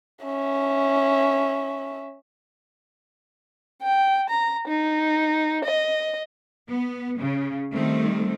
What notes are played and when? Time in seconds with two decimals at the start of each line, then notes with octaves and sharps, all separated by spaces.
0.24 C#4 E5
3.82 G5
4.29 A#5
4.68 D#4
5.64 D#5
6.69 B3
7.19 C#3
7.74 D#3 G3 A3 C4